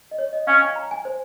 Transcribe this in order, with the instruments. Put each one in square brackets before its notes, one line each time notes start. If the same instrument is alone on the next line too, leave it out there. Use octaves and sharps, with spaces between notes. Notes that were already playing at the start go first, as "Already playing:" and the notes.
[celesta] D#5
C#5
D#5
[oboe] C#4 [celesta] F5
[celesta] G#5
A#5
G#5
C5